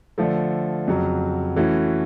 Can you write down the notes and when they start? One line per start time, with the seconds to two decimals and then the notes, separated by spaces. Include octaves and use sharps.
0.18 D3 F3 A3
0.87 F2 C#3 F#3
1.56 E3 A3 C#4 F#4